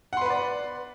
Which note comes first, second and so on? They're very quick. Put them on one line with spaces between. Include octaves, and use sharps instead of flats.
F#5 C6 B4 B5 D5